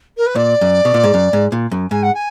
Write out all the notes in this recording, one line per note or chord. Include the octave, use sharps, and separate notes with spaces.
A#4
B4
A#2 D5
F#2
B2
A#2
G#2
F#2
G#2
A#2
F#2
G#2 G#5
F#5
G#5